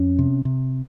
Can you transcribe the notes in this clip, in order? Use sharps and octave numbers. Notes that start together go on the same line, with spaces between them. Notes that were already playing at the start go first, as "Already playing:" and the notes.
Already playing: F2 C#4
C3
C3